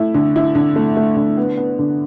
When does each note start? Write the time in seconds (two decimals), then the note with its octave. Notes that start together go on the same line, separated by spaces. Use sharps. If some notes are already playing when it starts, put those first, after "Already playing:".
Already playing: A3 E4
0.14 D3
0.36 E4
0.55 D3
0.76 A3
0.97 A3
1.17 D3
1.37 B3
1.57 B3
1.79 D3